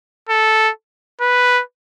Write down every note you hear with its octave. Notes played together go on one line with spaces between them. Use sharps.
A4
B4